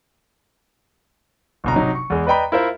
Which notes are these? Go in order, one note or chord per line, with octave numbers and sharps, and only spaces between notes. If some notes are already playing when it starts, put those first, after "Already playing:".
G1 B2 A#5
C3 F#3 D#4
C#6
E2 G#3
B4 D5 D#5 G5 A#5 B5
E4 F4 A#4 C5 E5